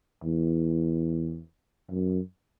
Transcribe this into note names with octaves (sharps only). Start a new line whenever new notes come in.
E2
F#2